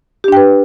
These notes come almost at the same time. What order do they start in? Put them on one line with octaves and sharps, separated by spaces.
G4 D4 G5 B4